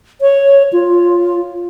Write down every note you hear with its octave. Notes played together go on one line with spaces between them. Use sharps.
C#5
F4